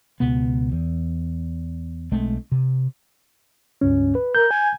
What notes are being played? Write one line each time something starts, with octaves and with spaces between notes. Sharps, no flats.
C#2 B2 B3
E2
B1 G#3 A3 C4
C3
C#2 G2 C#4
B4
A#4 G6
G#5